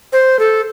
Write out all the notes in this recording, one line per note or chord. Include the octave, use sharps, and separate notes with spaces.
C5
A4